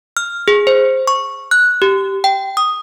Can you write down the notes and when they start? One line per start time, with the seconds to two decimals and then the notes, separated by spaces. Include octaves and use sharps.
0.17 F6
0.48 G#4
0.67 C5
1.07 C#6
1.51 F#6
1.82 G4
2.24 G5
2.57 D#6